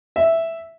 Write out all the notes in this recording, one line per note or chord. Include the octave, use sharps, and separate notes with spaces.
E5